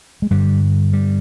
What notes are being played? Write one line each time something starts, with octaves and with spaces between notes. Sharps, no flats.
G#3
G2 D3 G3
G3